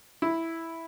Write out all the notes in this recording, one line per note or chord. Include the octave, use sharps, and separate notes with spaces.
E4